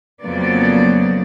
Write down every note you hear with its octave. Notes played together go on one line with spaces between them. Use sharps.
F2 C#3 F#3 A#3 B3 D5